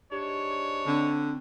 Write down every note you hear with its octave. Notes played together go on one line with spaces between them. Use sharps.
G#2 D4 G4 C#5
D3 C4